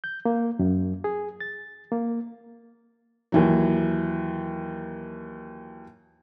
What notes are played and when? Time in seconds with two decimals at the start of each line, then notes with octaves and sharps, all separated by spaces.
0.04 G6
0.25 A#3
0.59 F#2
1.04 G#4
1.41 A6
1.92 A#3
3.32 D#2 E3 F#3